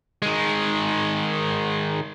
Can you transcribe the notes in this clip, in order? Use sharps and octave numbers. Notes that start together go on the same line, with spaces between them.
D#3 G#3